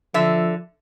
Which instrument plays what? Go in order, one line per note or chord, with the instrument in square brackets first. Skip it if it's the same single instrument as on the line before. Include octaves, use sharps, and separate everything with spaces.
[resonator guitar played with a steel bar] D3 E5 [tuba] F3